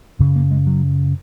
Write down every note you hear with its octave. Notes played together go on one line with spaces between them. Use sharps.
F#2 C#3
A#3
G#3
F#3